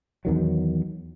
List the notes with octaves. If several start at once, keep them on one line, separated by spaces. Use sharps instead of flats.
E2 D#3 F#3